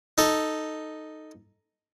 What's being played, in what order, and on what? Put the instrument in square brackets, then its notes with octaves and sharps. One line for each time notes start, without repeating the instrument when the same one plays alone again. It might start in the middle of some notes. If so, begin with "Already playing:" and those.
[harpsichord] D#4 A4